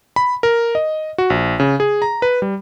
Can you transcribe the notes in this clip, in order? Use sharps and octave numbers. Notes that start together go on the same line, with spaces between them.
B5
A#4
D#5
F#4
A#1
C#3
G#4
A#5
B4
G3